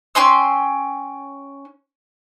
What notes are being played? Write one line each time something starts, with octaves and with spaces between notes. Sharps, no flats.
C#4 G5 C6 E6